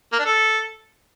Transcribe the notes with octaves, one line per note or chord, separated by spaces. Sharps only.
A#3
D4
A4